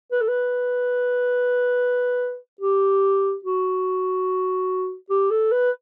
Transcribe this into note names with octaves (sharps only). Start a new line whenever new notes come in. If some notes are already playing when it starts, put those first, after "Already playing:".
B4
A4
B4
G4
F#4
G4
A4
B4